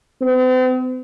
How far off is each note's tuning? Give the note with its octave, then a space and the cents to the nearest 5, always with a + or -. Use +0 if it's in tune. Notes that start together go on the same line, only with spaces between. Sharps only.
C4 -45